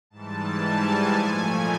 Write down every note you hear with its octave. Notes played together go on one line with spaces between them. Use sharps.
G#2 E3 G3 A5
G#5
A#2 F3 A3